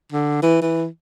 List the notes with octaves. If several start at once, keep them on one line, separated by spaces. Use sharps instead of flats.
D3
E3
E3